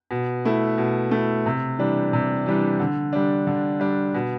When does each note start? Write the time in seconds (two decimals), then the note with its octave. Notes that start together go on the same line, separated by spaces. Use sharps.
0.11 B2
0.45 A3 E4
0.78 B2
1.11 A3 E4
1.46 C3
1.79 E3 G3 D4
2.13 C3
2.46 E3 G3 D4
2.80 D3
3.13 G3 D4
3.47 D3
3.80 G3 D4
4.15 B2